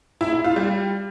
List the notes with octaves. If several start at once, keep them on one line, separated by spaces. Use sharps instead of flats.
E4
E4
F4
G3